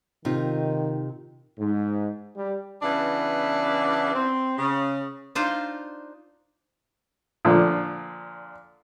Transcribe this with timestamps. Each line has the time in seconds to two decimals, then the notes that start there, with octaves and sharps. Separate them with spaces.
0.25 C3 D#3 D#4 F4
1.58 G#2
2.37 G3
2.82 C#3 E3 B3 D4
4.14 C4
4.58 C#3
5.35 D4 D#4 F4 C5 F5
7.45 A#2 D3 F3